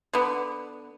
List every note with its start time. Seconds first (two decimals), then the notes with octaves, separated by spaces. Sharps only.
0.13 D3 B3